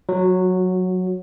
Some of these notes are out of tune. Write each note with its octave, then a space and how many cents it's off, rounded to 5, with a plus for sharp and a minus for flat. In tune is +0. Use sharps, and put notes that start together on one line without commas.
F#3 -10